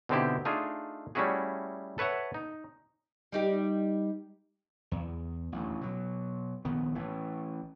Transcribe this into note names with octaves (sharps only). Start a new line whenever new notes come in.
B2 D3 C4 D#4 E4 G4
A3 D4 D#4 F4 G#4
G3 A3 C#4 E4 F#4 G#4
A4 B4 C#5 E5 F#5
D#4
G3 D#4 G4
E2
A1 D2
B2 F#3
A#1 D#3 B3
A1 A2 E3